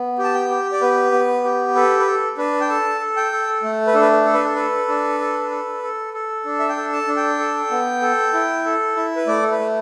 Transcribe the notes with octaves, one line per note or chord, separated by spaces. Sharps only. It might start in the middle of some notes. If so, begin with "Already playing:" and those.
Already playing: B3
G4
A5
G5
G4
D5
B3 B4
B3
G4
A4 B4
B4
A4
D4 B4
G5
A4 A5
A4
G5
A4
A3
B4
D4 A4
B4
A4
B4
A4
A4 B4
D4
A4
A4
A4
A4
D4
E5
G5
A4
A5
D4
G5
A4
B3
A4
E4
A4
E4
B4
A3 D5
A4
B4
A3